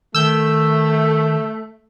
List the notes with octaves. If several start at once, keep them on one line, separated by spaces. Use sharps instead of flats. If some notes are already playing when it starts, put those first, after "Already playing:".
D#3 A3 E6 G6